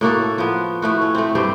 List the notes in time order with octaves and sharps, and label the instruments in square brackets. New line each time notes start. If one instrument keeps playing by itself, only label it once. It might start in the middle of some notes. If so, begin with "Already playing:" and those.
[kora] A2 A#3 F#4 A4
F3 B3
A2 A3 F#4
C#4
A3 C4
G2 G3 C5